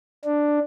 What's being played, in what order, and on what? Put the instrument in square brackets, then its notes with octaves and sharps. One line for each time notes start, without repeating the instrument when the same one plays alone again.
[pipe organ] D4